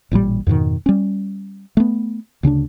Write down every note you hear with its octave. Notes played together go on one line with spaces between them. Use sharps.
A1 A#2 C#3 G3
F2 G#2 B2 D#3
G3 C#4
A3 B3
D2 C#3 C#4 D4